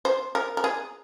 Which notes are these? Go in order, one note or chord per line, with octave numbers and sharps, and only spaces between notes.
C5
A#4
A#4
G#4